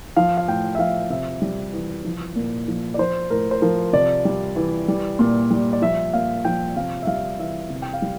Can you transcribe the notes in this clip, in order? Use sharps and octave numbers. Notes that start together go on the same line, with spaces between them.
F3 F5
F5
A2 G5
E5
F3 F5
C3 E5
G3
E3
F3
A#2
F3
D5
F3 C5
A2 A#4
C5
F3 A#4
C3 D5
G3
E3
G3
A#2
G3
D5
F3 E5
A#2 F5
F3 G5
C3 F5
E5
G3 F5
E3 E5
C3
G5
F5
G3